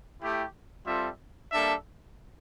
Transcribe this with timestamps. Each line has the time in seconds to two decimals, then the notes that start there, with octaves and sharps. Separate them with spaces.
0.20 A3 E4 G4
0.85 G3 C4 F4 A4 E5
1.50 G3 A#3 D4 A4 E5